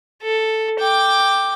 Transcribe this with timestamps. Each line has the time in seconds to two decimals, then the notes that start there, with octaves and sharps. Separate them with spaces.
0.22 A4
0.80 G5 D6